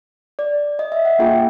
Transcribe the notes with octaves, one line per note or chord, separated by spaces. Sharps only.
D5
D#5
E5
F#5
A#3 D4 F4 G#4 G5